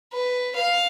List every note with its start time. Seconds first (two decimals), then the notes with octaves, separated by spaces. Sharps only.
0.13 B4
0.56 F5